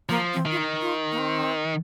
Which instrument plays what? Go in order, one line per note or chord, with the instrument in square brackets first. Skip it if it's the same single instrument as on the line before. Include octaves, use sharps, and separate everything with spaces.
[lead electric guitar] F3 [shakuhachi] A#3
[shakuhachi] C4
[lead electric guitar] D#3
[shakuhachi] F4
D#4
F4
A#3
C4